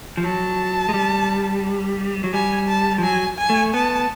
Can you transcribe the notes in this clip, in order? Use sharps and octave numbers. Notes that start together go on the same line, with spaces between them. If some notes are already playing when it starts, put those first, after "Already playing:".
F3
F#3 A5
G#3
G3
F#3
G3 G#5
A5
F3
F#3 G#5
G#5
A3
B3 A5